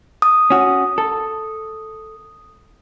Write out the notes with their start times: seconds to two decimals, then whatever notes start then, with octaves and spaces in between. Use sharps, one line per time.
0.22 D#6
0.50 C#4 F#4
0.98 A4